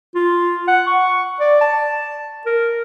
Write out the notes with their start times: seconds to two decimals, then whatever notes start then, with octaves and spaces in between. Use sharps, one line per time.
0.15 F4
0.68 F#5
0.87 C#6
1.40 D5
1.61 A5
2.46 A#4